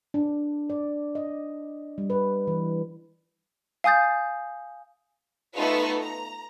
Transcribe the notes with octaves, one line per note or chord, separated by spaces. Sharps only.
D4
D5
D#5
G3
B4
E3
F5 G#5 D#6 G6 A6
A3 B3 D#4 F4 B4 C#6
A#5